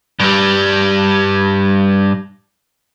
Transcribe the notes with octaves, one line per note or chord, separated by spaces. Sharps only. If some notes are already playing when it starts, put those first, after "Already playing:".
G2 G3